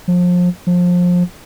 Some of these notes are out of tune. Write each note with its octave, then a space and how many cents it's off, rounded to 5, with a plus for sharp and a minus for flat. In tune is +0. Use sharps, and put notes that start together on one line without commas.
F3 +30
F3 +25